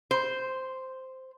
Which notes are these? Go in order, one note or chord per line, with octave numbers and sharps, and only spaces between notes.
C5